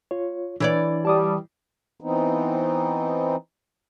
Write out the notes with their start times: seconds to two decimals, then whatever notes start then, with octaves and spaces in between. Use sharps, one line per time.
0.11 F4 C#5
0.60 E3 D4 C#5 D5
1.05 G3 A5 D6 D#6
2.01 E3 B3 C4 D#4